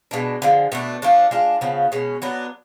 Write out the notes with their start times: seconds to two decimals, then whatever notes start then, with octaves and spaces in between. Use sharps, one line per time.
0.11 B2 G#3 D4
0.42 D3 F3 G#3
0.72 B2 A3 D4
1.02 F3 A3 D4
1.31 G#3 D4 F4
1.61 C#3 F3 B3
1.92 B2 G#3 C#4
2.22 F#3 B3 D4